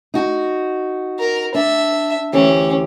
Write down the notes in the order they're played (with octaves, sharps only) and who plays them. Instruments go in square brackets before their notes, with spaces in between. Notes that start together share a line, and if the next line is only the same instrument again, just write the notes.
[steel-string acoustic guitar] D#4 F#4
[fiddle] A#4
[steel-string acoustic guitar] D4 [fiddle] E5
[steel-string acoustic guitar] D2 E3 G4 [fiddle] C#4